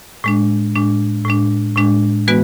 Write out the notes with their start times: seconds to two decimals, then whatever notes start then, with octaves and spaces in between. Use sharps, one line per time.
0.24 A2 G#3 D4
0.75 A2 G#3 D4
1.25 A2 G#3 D4
1.76 A2 G#3 D4
2.28 E3 G#3 B3 F#4 B4